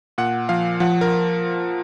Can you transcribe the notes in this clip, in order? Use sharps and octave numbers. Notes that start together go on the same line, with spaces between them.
A#2 F#5
F3 F5
F3 F#5
A#4